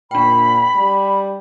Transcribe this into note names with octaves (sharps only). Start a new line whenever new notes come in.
A#2 D4 G5 B5
G3